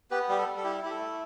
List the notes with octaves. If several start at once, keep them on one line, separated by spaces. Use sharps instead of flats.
B3 G4 B4
G3 G4
A4
G3
A4
E4 G4
E4 G4
A4
A3